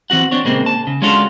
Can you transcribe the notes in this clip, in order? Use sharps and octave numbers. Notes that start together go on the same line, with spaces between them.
E3 C4 F#4 F#5
C4 D4 C#5
A#2 C#3 G#3 A#3 C4
A5
C#3
G#3 C#4 D4 F4 F#4 A4